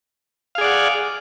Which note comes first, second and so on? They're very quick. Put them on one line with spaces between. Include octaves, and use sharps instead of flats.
F5 G#4 D5 F#5